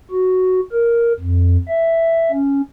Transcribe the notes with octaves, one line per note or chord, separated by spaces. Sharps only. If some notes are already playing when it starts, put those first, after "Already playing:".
F#4
A#4
F2
E5
C#4